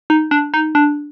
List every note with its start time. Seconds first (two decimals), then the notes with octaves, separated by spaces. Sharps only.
0.10 D#4
0.31 D4
0.54 D#4
0.75 D4